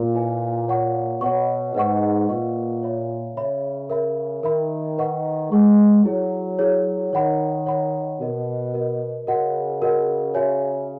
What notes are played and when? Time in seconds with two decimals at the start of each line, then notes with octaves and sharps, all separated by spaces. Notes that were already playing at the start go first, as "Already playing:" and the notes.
Already playing: A#2
0.14 E4 B4 D#5 G#5
0.68 C#5 F#5 C#6
1.21 B2 C#5 F#5 C#6
1.75 G#2 B4 D#5 F#5 C#6
2.29 A#2 B4 D#5 F#5 C#6
2.83 C#5 E5 B5
3.36 C#3 C#5 E5 B5
3.90 A#4 E5 B5
4.43 D#3 A#4 E5 B5
4.98 B4 D#5 F#5 C#6
5.52 G#3 B4 D#5 F#5 C#6
6.05 F#3 E4 G#4 C#5
6.59 E4 G#4 C#5
7.13 D#3 C#5 F#5 B5
7.66 C#5 F#5 B5
8.20 B2 F#4 A#4 D#5
8.74 F#4 A#4 D#5
9.27 C#3 F#4 A#4 D#5 F#5
9.82 F#4 A#4 D#5 F#5
10.35 F#4 C#5 E5 G#5